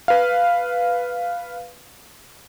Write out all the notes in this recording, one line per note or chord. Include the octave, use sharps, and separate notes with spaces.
B4 F5